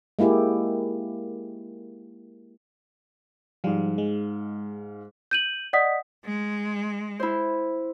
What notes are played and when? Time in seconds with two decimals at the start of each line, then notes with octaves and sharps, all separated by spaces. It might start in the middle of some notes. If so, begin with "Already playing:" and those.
0.19 G#3 A#3 E4 G4 G#4
3.64 G#2 F3 G3 F5
3.98 G#3
5.31 G6 D#7 F#7
5.73 D5 D#5 F#5 D#6 B6
6.25 G#3
7.20 E4 C5